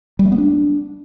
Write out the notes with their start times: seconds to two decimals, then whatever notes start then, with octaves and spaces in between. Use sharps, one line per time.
0.19 G3
0.26 A3
0.32 B3
0.38 D4